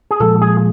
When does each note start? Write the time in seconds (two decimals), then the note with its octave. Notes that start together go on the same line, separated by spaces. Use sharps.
0.11 G#4
0.20 A#2 F3 G#3 A4
0.41 G#4